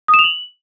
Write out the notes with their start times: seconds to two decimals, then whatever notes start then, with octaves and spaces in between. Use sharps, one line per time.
0.08 D#6
0.14 E7
0.19 F7
0.24 F#7